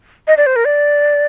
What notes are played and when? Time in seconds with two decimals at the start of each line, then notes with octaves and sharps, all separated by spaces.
0.27 D#5
0.37 D5
0.46 C5
0.56 A#4
0.65 D5